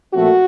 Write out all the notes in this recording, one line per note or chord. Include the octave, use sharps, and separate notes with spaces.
A#2 F3 A3 C4 F#4